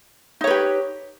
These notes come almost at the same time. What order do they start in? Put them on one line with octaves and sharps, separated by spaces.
D#4 C#5 B4 G4